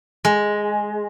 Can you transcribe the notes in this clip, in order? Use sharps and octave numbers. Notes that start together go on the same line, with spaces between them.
G#3